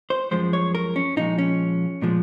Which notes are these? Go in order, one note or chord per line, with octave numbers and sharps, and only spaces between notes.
C5
F#2 F3 G#3 C5
C#5
A#4
C#4
A#2 F3 G#3 D#4
C#4
A#2 F3 G#3